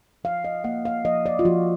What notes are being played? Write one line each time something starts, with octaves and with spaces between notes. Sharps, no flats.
F3 F5
D#5
A#3 F#5
F5
F3 D#5
D5
F4
F3 F#4